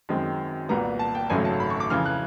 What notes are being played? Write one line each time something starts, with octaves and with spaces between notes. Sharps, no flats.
F#2 D#3 G#3 C4
C2 A#2 G3 B3 A#5
A5
G5
G#1 F#2 C#3 F#3 A3 G#5
A5
B5
C#6
D6
F2 C#3 E3 F6
F#6